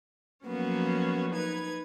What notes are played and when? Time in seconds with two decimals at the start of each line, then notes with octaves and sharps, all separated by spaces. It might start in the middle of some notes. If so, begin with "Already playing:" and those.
0.46 F3 F#3 A#3 B3 C#4 F#4
1.32 D#4 B4 G#6